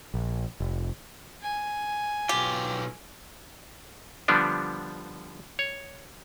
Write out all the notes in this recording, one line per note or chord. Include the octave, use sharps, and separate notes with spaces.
A#1
F1
G#5
B1 F4 G4
D3 F3 G3 B3 D4
C#5